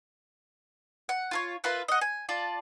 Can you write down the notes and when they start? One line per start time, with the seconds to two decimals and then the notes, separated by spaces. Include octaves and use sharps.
1.09 F#5
1.31 F4 A#4 C#5
1.64 F4 A#4 B4 E5
1.88 D#5 F#5
2.01 G#5
2.29 F4 D5 A5